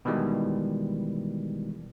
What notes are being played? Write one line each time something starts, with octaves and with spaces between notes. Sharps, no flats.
B2 D#3 E3 G3 G#3